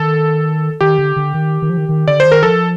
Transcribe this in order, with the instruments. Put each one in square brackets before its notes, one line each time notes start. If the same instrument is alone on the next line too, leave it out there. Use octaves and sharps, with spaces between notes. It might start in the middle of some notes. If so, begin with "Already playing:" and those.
Already playing: [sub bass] D#3 [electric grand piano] A4
[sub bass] D#3 [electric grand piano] G4
[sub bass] D3
D3
D#3
D#3
F3
D#3
D#3
[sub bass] D3 [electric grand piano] D5
[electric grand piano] C5
[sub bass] D#3
[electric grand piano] A#4
[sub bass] F3 [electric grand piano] A4